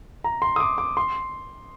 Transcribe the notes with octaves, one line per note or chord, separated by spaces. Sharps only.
A#5
C6
D#6
D6
D6
C6